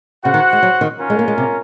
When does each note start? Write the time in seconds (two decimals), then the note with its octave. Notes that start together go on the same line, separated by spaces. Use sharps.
0.24 C#3 F#4 C5 F#5
0.34 D#3
0.53 G#3
0.63 F#3
0.81 D#3
0.99 C#4 F4 A#4
1.10 G#3
1.19 A#3
1.28 G#3
1.38 C3